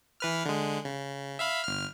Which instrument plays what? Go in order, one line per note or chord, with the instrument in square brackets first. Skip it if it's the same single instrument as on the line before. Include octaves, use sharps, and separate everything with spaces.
[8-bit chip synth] E3 B4 F6
D3 G#3
C#3
E5 F5 B5
G1 F6